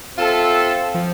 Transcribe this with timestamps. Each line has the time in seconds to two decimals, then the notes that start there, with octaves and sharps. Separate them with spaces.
0.17 C4 F4 A4 E5
0.94 F3